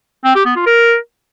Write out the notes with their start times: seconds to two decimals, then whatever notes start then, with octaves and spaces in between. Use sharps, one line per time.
0.25 C4
0.35 G4
0.45 B3
0.56 F4
0.66 A#4